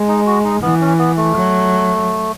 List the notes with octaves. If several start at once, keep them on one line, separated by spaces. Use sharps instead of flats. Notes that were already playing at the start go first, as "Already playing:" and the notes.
Already playing: G#3
D#4
F#4
D#4
E3 B3
C#4
B3
A3
F#3